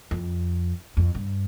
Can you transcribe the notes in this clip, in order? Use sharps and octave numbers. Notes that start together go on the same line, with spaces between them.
F2
F2
G2